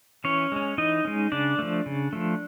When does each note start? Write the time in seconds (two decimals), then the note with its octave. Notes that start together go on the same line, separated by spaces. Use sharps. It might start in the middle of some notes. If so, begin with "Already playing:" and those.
0.24 E3 C#4 C#5
0.52 G#3 C#4
0.78 E3 D#4 D#5
1.05 G#3 C#4
1.32 C#3 D4 D5
1.59 F3 A3
1.86 C#3
2.13 F3 A3